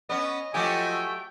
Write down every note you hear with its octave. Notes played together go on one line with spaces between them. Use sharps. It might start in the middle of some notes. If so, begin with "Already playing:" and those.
B3 C#4 D#5
F3 F#3 A3 G4 D#5 G5 G#5